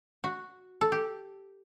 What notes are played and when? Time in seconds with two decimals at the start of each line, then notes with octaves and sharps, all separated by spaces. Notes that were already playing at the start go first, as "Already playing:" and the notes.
0.24 F#4
0.81 A4
0.92 G4